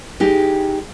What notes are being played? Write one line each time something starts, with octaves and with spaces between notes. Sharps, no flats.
G#3 D#4 G4